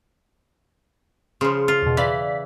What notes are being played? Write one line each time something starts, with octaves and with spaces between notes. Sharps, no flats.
C#3 F3 C6
F4
E2 B2
E3 D5 F5 B6